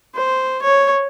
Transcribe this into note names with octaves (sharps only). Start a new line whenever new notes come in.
C5
C#5